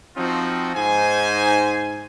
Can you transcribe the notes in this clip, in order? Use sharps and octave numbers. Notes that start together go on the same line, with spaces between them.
F3 C4 D#4 F4 F#4
G#2 D#4 C5 G#5